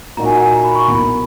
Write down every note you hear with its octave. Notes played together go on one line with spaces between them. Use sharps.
A#2 A#3 D#4 F#4 A#5
G#5
F#5
G#5
A#5
B5
C#6
B1 B2 A#3 E4 B5